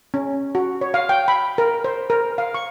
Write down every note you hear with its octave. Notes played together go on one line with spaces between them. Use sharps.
C#4
F#4
C#5
F5
G5
B5
A#4
C5
A#4
F5
C#6